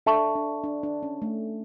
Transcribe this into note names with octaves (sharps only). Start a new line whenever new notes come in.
D4 A4 E5 A5 C#6
D4
D4
D4
C#4
A3